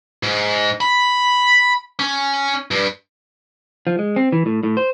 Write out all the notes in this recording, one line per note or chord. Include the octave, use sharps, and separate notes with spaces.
G#2
B5
C#4
G2
F3
G#3
C4
E3
A2
A2
C5